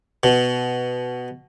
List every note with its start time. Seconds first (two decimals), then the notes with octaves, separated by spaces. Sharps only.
0.23 B2